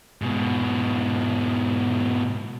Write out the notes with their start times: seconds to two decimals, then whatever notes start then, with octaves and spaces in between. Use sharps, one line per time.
0.22 G#2 B2